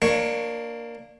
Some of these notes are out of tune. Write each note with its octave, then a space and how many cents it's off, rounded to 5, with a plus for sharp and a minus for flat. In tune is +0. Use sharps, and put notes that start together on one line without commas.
A#3 +0 D4 +20 C#5 +0